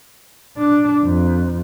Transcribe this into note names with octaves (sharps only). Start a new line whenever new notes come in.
D4
F2